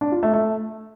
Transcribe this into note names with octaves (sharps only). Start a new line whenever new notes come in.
D4
F4
A3
A3